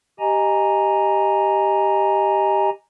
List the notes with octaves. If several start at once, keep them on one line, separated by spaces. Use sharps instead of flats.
G4 D#5 G#5 A#5